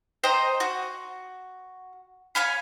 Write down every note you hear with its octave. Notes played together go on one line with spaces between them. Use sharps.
C5 D#5 G5 A#5
F#4
C#5 F5 G#5 B5